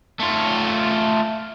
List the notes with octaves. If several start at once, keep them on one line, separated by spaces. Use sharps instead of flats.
A3 F4